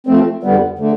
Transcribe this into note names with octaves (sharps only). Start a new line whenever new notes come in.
F3 A3 C4
F2 D3 G3 B3
D3 A3